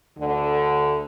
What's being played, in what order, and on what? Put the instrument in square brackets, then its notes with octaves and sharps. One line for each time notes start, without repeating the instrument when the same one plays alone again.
[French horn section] D2 D3